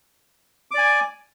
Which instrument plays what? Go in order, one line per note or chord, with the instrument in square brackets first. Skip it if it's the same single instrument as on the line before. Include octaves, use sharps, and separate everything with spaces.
[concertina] D6
D5
G#5